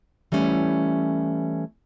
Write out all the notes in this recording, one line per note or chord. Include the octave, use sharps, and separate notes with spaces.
E3 G3 A3 C#4